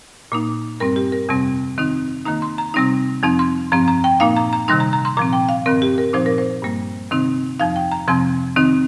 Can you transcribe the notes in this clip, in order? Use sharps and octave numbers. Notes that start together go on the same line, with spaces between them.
A#2 A#3 D#4
G2 G3 C4 A#4
G4
A#4
F2 C3 G3 C4
D#3 C4 D#4
D#3 A#3 D#4 A#5
C6
A#5
C3 G3 C4 D#4
F2 F3 C4 D#4
C6
G2 F3 C4 A#5
A#5
G5
A#2 A#3 D#4 F5
A#5
A#5
C3 D#3 G3 D#4 C6
A#5
A#5
C6
A#2 F3 C4 A#5
G5
F5
G2 D#3 C4 A#4
G4
A#4
A#2 F3 C4 D#4 C5
A#4
C5
G2 G3 A#3
C3 D#3 C4 D#4
F2 F3 D#4 F5
G5
A#5
F2 C3 F3 C4 C6
D#3 C4 D#4